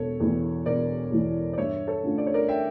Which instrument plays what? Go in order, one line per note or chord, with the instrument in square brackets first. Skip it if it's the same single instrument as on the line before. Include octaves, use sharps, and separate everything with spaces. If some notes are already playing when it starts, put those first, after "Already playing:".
Already playing: [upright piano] E1 [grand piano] A4 C#5
[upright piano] E2 E3
[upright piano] E1 [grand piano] A#4 D5
[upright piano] E2 E3
[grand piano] D5
[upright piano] G2 [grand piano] C#5 E5
[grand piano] A4 C#5
[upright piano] D3 A3 C#4 F4
[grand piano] D5
C#5
A#4 D5
E5 G5